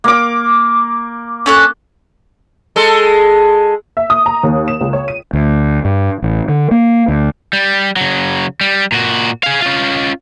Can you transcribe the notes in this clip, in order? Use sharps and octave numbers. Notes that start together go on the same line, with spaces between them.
A#3 D6
C#4 A4 F#6
G#3 A4
E5
D#6
A#5
D#2
E7
C#2
C#5
D#7
D2
G2
A1
D3
A#3
D2
G3
C#3 F#3
G3
A#2 F#4
G#4 F5
C#4 F4